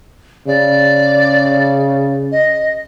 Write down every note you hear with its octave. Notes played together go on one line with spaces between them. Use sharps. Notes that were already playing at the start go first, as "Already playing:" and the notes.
C#3 D5
D#5